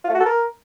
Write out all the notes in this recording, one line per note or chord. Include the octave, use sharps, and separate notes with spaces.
F4
A3
F#4
A4
A#4